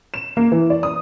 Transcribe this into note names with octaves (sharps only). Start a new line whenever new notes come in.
E7
A#3
E3
D5
D#6